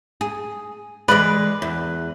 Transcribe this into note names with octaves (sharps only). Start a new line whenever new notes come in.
G#4
E3 G#3 B4 D5
E2